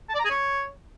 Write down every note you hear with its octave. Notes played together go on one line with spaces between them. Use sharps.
A5
D5
A#5
G#4
C#5